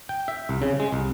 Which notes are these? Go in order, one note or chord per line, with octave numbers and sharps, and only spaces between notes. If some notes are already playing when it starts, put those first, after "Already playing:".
G5
E5
C2
C#3
G#3
C2